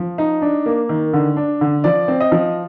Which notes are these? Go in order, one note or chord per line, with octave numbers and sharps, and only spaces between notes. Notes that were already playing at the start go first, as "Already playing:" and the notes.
Already playing: F3
D#4
D4
A#3
D#3
D3
D4
D3
F3 D5
C4
D#5
F3